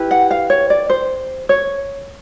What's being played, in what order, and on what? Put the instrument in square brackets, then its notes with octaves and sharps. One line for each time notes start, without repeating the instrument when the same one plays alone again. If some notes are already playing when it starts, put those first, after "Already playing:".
Already playing: [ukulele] E4 G4 B4
F#5
F5
C#5
D5
C5
C#5